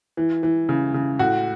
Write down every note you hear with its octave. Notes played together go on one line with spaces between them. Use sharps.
E3
E3
C#3
C#3
A2 F#4